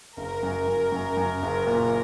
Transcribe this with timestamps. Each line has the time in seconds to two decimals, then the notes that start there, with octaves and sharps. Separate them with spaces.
0.17 F#1 A#4
0.43 F#2
0.67 F#2
0.92 F#2
1.17 F#2
1.42 F#1
1.67 A#2